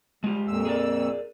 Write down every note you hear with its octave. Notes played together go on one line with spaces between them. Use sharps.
G3 G#3 F4 G4
F2 A#2 E6
G#4 A#4 D5